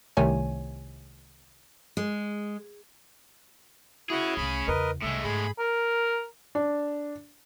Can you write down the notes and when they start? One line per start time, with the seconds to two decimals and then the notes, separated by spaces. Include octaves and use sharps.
0.17 C2 C3 D#3 A3 C#5 G#5
1.97 G#3
4.10 C#4 E4 F#4 G#4
4.37 C2 A3 B5
4.68 E2 C#3 A#4 B4 D#5
5.03 C2 A2 G#3 E5
5.24 G#2 G#4 B5
5.59 A#4
6.55 D4